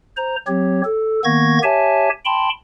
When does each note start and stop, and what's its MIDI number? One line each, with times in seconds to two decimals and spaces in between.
0.17 0.36 72
0.17 0.36 82
0.47 0.82 54
0.47 0.82 60
0.47 0.82 67
0.47 0.82 73
0.85 1.20 69
1.24 1.59 51
1.24 1.59 58
1.24 1.59 59
1.24 1.59 85
1.24 1.59 92
1.24 1.59 94
1.63 2.10 67
1.63 2.10 73
1.63 2.10 76
1.63 2.10 80
1.63 2.10 81
2.25 2.49 79
2.25 2.49 81
2.25 2.49 83
2.25 2.49 84